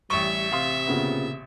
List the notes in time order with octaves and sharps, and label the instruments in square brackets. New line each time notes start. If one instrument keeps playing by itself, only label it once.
[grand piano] A1 C#6 [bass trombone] G3 [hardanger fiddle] E5
[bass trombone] C3 [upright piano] F5 C6 D#6
[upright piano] A#2 C#3 B3